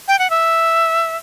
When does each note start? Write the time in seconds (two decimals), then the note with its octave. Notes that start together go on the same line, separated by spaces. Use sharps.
0.08 G5
0.19 F#5
0.30 E5